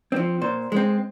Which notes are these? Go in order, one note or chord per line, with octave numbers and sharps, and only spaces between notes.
F3 C4
A#2 C5
G#3 C4